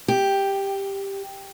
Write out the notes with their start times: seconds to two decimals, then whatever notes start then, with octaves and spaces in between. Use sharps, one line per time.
0.08 G4